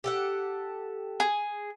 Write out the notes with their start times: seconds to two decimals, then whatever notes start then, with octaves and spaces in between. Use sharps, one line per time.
0.04 G4 A4 F#5
1.20 G#4